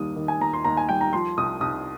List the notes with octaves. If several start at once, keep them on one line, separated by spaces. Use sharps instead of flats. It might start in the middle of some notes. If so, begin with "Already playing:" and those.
Already playing: D#2 G3 D#6
D#3
G#5
D#2 A#5
C6
D#2 A#5
G#5
G3 G5
A#5
F3 C6
C2 D#6
C2 D#6